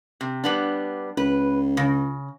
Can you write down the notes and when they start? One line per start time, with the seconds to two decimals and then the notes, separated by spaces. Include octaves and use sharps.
0.21 C3
0.44 G3 B3 D4
1.17 C#2 B4
1.77 C#3